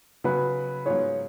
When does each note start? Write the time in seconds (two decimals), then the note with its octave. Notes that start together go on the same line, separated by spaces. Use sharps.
0.24 C#3 F#3 C#4 F#4 B4
0.85 G#2 F#3 B3 F4 G#4 C#5